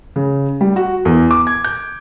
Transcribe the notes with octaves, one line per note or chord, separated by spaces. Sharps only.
C#3
G3
F#4
E2
D6
G#6
G6